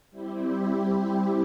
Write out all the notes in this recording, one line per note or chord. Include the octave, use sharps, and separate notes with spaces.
G3 C4 E4 G4